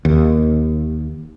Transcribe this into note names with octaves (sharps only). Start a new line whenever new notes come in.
D#2